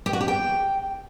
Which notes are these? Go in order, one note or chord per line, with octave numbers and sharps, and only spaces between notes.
G4
F#4
G4
G5